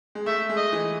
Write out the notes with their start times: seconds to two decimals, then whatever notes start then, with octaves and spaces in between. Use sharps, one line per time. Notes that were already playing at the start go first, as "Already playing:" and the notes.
0.15 G#3
0.26 A3 E5
0.49 G#3
0.57 D#5
0.72 E3